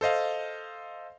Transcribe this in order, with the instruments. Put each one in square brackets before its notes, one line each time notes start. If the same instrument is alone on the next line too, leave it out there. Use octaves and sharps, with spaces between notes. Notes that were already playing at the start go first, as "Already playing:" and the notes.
[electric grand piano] A4 C5 D#5 F5